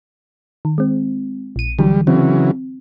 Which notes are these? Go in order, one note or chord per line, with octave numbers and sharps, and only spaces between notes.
D#3
G#3 C4
A#1 D#7
D3 E3 F#3 G3
C#3 E3 F#3 C4